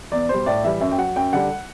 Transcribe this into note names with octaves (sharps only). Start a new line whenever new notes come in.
E2 D5
B2 G3 C5
A2 D5
E3 G3 E5
F#2 E5
G5
F#3 F#5
F#2 G5
D3 G3 F#5